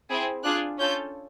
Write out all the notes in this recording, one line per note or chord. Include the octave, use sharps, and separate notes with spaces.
C4 E4 G#4
D4 F4 G#4 F#6
C#4 F4 A4 G6